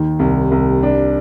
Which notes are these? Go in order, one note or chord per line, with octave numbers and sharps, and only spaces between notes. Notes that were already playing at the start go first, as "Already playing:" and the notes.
Already playing: D#2 D#3
C2
C2
D4